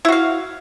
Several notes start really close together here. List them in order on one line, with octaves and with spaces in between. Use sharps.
E4 F#4 F5